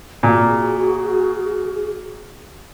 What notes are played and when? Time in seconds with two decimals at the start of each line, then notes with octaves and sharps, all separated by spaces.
0.23 A#2 F#4 G#4